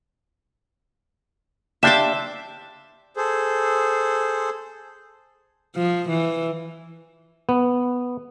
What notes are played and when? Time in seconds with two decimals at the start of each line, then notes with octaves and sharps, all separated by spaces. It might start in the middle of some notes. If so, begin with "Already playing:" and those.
1.83 D4 G4 E5 F5 C6 D6
3.17 G#4 A4 C5
5.76 F3
6.09 E3
7.49 B3